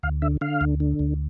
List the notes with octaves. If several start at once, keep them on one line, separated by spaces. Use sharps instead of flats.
D2 F5
D3 E5
D3 F5
D2
D3
D2